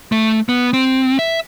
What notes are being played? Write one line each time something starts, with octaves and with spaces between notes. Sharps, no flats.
A3
B3
C4
E5